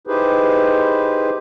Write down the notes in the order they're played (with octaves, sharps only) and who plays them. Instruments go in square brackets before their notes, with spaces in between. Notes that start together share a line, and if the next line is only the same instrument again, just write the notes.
[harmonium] D#4 E4 G4 G#4 B4 C5